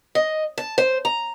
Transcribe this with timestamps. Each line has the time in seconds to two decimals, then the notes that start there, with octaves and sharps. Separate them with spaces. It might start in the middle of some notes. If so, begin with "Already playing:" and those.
0.15 D#5
0.58 A5
0.78 C5
1.05 A#5